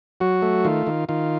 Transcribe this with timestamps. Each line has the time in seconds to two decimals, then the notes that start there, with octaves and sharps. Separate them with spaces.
0.20 F#3 F#4
0.42 A3
0.65 D#3 F4
0.87 D#3
1.09 D#3 F4